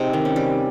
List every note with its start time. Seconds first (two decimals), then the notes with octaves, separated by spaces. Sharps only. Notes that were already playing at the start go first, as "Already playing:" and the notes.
Already playing: C3 G#3 C4 D#4
0.13 D#3
0.25 C#4
0.36 G3